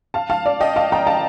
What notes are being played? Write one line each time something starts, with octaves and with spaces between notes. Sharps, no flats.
F5 A5
F5 A5
D5 F5
D#5 G5
F5 A5
G5 A#5
F5 A5